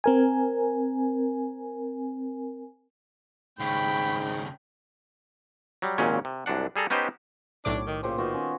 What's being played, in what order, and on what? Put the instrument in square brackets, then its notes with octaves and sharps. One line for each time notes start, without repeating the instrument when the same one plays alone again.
[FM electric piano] C4 A#4 G#5
[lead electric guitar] D#2 C#3 [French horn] G#2 [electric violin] G5 [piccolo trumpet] B5
[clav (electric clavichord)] F#3 G3
G#1 D#2 A#2 C#3 F#3 C#4
C3
C2 F#2 D4 F#5
G3 G#4 A4 A#5
B3 C#4 D#4 G4 B4 C5
[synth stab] B1 A2 D6 [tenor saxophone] D4 [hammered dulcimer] C#5
[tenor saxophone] D#3
[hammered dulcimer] A#2 G4 C5 [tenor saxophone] C#3
[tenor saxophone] D#3 [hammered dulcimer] B3 F4 F#4
[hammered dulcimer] C#4